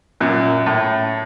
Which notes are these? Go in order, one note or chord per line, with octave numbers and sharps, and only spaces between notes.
F#2 A#2
A2